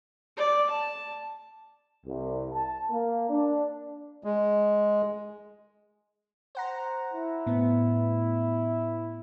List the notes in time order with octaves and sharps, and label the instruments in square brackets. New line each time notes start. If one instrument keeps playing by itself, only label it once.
[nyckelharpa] D5
A5
[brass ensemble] C2
A5
A#3
D4
[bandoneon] G#3
[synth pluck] C5 F#5 A#5
[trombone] E4
[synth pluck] A2 B3